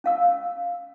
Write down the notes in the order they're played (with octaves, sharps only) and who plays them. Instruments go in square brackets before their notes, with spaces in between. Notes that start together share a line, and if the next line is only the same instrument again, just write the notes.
[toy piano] C#4 F5 E6